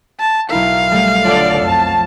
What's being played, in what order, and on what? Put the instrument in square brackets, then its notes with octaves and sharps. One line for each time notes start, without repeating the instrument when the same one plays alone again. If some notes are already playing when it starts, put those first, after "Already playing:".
[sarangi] A5
[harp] B1 E4 A#4 [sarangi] F5
[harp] G3 A3
[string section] D3 A4 D5 [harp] F4 C#5 F#5
[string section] F2 A5